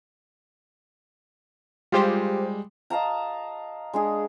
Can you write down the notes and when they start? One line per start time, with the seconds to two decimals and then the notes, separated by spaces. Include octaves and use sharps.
1.92 G3 G#3 F4 G4 C5
2.90 D#5 F5 A5 A#5
3.93 G#3 D4 G#4